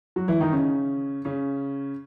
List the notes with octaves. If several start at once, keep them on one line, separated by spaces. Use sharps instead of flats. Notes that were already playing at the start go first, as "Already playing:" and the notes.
F#3 F#4
E3 E4
D#3 D#4
C#3 C#4
C#3 C#4